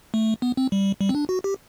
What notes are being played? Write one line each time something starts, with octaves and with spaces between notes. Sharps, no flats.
A3
B3
C4
G3
G3
C4
D4
F#4
G4